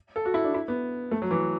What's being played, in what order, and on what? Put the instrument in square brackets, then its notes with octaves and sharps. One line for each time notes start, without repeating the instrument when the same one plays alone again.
[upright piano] A4
F#4
E4
D4
E4
B3
A3
F#3
E3